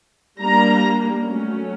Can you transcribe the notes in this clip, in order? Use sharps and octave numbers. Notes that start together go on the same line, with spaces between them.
G3 A#3 D4 A#5
F#3 A3 C#4